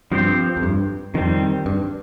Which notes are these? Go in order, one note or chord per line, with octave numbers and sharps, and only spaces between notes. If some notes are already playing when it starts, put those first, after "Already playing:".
G2 F3 C4 G4 C5
F2
G2
F2 D#3 G3 C4
G2